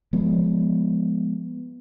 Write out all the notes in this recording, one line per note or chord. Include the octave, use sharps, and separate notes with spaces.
F3 G#3 B3